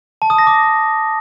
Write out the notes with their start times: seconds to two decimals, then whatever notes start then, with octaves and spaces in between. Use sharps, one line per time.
0.22 A5
0.30 D#6
0.38 A#6
0.47 D6